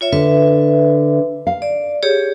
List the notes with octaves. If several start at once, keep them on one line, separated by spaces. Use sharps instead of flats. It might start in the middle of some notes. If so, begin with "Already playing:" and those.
F4 C#5 E5
D3 B4 E5
F5
D5
G4 G#4 C#5